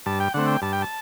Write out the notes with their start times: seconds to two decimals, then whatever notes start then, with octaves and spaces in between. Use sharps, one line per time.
0.06 G2 A5
0.20 G5
0.34 D3 A3 C4 F#5
0.48 G5
0.62 G2 A5
0.73 G5
0.82 A5